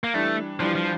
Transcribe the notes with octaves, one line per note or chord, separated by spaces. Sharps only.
A#3
E3 G3 A3 D4
E3 F3 G3 D4
F3